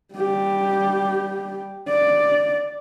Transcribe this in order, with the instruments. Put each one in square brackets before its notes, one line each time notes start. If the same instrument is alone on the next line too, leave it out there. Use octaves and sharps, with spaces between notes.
[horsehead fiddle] G3 G4
D5